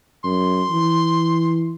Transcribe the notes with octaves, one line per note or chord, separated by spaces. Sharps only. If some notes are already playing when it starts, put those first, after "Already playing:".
F#2 C6
E3